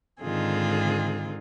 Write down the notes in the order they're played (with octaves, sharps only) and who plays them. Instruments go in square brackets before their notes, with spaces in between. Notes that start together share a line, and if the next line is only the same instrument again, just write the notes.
[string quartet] G#2 D3 D#3 C4 F4 G#4